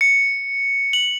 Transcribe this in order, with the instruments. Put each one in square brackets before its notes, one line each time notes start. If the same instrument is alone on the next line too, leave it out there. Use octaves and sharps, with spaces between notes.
[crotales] C#7
F#7